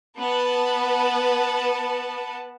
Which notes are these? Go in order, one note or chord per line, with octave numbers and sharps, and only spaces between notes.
B3 B4 A5